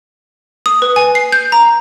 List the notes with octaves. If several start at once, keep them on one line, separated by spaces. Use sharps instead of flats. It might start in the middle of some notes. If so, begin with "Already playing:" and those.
D#6
B4
G#5
C7
G6
A#5